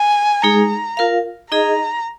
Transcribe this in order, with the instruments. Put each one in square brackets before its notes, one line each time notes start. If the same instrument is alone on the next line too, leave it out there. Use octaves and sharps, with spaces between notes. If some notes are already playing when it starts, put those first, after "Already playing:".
Already playing: [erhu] G#5
[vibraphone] G#3 D#4 G#4 [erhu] A#5
[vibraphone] F4 A#4 F5
[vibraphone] D#4 G#4 D#5 [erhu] A#5